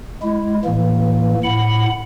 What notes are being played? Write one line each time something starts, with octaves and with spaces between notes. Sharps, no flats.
G#3 E4
A2 E3 A#3
A2 F#5 B5